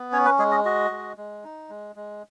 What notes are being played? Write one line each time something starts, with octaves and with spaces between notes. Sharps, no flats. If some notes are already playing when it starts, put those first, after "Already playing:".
Already playing: B3
C#4 C#5
B4
G#3 G#4
D#5
F#4 D#5
G#3
G#3
D#4
G#3
G#3